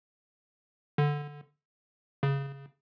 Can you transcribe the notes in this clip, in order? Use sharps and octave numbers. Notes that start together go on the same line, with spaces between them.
D3
C#3